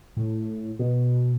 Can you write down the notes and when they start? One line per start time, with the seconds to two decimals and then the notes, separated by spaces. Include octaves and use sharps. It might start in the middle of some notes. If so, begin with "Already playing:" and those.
0.17 A2
0.79 B2